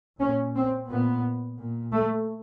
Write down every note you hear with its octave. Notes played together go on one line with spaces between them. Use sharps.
A#2 C#4
C4
A#2 B3
A#2
A3